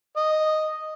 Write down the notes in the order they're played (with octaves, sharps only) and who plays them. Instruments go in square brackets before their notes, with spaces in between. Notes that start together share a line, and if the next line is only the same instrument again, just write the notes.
[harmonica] D#5